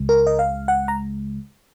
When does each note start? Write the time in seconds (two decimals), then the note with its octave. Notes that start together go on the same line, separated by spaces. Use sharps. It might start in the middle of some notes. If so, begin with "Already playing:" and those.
Already playing: C#2 C#3 G#3
0.09 A#4
0.27 D#5
0.39 F5
0.68 F#5
0.88 A#5